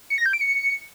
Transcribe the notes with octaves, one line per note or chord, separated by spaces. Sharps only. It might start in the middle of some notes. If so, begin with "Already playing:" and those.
C#7
A#6
G6
D7
C#7